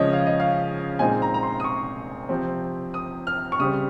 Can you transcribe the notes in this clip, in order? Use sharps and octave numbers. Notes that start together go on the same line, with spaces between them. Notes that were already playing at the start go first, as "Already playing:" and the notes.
Already playing: C#3 F3 G#3 C#5 D#5
F5
D#5
F5
A#2 G#3 C4 D#4 G#5
A#5
A#5
C6
D#6
C#6
C3 F3 C4
D#6
F6
C#6
C#3 G3 C4 D#6